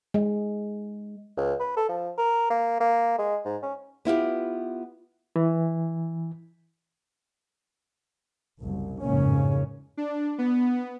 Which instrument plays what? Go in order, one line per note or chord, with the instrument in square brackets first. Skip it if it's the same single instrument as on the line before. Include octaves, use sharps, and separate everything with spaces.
[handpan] G#3
[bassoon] C#2
B4
A4
F3
A#4
A#3
A#3
G#3
G#2
C#4
[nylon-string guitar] B3 E4 F4 G4
[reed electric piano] E3
[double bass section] F#1 C2
A1 F2 G#2 C#3 A#3 C#4
[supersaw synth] D4
B3